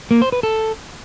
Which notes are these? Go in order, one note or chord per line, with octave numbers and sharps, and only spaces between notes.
A#3
C5
B4
A4